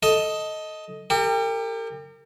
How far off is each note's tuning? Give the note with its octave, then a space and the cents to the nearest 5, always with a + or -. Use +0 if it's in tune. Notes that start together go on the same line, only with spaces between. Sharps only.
A4 +0 D#5 +10
G4 +30 A#4 -40